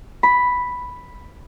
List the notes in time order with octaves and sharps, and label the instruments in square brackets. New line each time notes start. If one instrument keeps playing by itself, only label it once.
[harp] B5